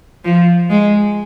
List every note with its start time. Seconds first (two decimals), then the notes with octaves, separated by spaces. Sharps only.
0.25 F3
0.70 G#3